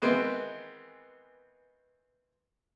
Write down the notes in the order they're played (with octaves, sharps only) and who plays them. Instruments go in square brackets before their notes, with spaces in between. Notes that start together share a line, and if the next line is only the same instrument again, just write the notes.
[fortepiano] D#3 E3 G#3 B3 C4